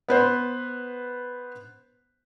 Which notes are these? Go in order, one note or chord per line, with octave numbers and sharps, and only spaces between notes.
B3 B4 C5